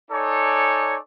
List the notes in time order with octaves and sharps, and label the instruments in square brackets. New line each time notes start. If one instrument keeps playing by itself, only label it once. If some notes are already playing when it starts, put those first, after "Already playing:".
[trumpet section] D#4 A4 C#5 D5 G#5